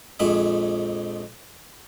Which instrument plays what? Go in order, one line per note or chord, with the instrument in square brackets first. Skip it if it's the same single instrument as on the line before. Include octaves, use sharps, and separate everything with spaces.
[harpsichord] A#1 F2 G#3 E5